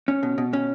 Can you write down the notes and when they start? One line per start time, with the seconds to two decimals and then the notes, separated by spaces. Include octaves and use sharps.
0.08 C#4
0.23 B2
0.38 B2
0.53 C#4